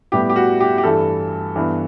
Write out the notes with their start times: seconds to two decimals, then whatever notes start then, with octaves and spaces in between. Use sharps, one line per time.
0.12 A2 G3 B3 G4
0.30 G4
0.36 F#4
0.60 G4
0.78 G4
0.83 G2 E3 A3 A4
1.56 G2 E3 B3